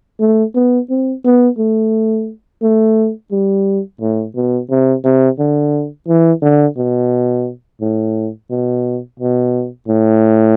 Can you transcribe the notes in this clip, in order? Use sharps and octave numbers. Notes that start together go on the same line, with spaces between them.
A3
B3
C4
B3
A3
A3
G3
A2
B2
C3
C3
D3
E3
D3
B2
A2
B2
B2
A2